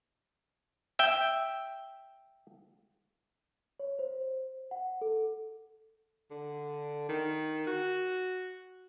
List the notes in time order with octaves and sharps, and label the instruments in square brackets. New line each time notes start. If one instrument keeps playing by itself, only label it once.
[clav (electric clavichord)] E5 G5
[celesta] C#5
C5
F#5
A4
[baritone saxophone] D3
D#3
F#4